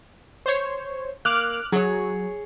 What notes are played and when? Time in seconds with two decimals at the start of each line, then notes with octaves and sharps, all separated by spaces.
0.46 C5 C#5
1.25 A#3 D6 F6 F#6
1.72 F#3 G#4 C#5